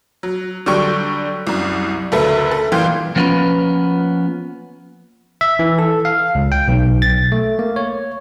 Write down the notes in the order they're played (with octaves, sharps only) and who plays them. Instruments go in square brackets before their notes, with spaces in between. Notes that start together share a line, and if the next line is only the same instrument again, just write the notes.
[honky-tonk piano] F#3
D3 F#3 G3 G5 C#6
C2 F#2
F#1 D2 A4 B4 E5
A4
C2 A#2 E3 F4 G5 C6
[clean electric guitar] F3 A#3 B3 C#4 F4 B4
[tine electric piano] E5
E3
A4
F5
C#2
G5
B1
A6
A3
A#3
C#5